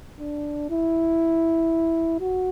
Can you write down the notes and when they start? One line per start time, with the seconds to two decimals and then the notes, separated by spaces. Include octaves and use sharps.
0.20 D4
0.70 E4
2.20 F#4